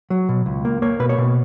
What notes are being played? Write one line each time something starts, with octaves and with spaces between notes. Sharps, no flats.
F#3
B2
C#2
A#3
A#3 C#5
B2 B4
C#5
B2